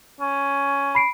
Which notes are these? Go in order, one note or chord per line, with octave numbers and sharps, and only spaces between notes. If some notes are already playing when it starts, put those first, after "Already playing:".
C#4
B5 C7 D7